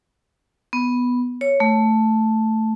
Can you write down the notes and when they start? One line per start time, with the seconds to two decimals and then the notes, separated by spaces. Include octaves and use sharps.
0.73 B3
1.41 C#5
1.60 A3